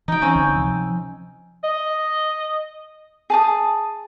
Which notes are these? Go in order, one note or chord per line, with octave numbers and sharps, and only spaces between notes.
E3 D#4 G5
C4 C#4
C#2 D3
C3 F3
D#5
G#4 A5 D#6